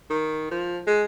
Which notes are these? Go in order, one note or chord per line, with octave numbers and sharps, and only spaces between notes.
D#3
F3
G#3